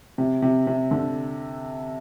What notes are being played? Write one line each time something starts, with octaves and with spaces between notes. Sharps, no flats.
C3
C3
C3
D3